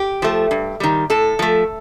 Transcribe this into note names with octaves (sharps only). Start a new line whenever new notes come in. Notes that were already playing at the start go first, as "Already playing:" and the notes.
Already playing: G4
F3 A3
G2
D#3 G3
A2 A4
F3 A3